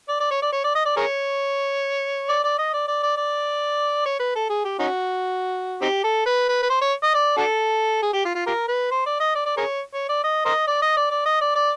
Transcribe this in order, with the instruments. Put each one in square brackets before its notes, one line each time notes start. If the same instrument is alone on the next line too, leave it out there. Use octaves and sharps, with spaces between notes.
[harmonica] D5
D5
C#5
D5
C#5
D5
D#5
D5
G#4 A#4 C#5
D5
D5
D#5
D5
D5
D5
D5
C#5
B4
A4
G#4
G4
C#4 D#4 F#4
C4 D#4 G4
A4
B4
B4
B4
C5
C#5
D#5
D5
D4 F#4 A4
G#4
G4
F4
F4
F4 G4 A#4
B4
C5
D5
D#5
D5
D5
G#4 A#4 C#5
C#5
D5
D#5
A#4 C5 D#5
D5
D#5
D5
D5
D#5
D5
D5